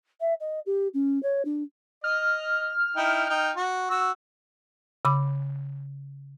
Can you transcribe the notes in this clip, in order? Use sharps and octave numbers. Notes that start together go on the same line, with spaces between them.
E5
D#5
G4
C#4
C#5
D4
D#5 F6
D#4 E4 G5
D#4 G5
F#4
F#4 E6
C#3 B5 D6